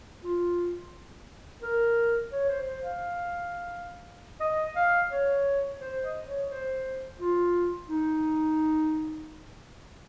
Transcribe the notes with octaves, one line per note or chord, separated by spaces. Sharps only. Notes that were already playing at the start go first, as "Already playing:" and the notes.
F4
A#4
C#5
C5
C5
F5
D#5
F5
C#5
C5
D#5
C#5
C5
F4
D#4